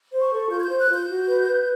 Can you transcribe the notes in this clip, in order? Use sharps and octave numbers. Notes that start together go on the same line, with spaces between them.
C5
C#6
A4
F4 G6
G#6
C5 G6
F#6
F4 G6
F#4
B4
B4